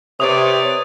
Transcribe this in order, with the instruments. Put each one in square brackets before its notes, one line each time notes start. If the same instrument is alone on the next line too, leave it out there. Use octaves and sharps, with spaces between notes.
[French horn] C3 [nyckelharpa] B4 D5 [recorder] C#5 [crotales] D#6